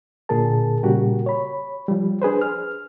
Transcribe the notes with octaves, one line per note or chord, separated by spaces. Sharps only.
A#2 D3 G#4 A#4 A5
A#2 C#3 G3 F#4 G4 A#4
C#5 B5
F3 G3
D4 G#4 B4 C5
F6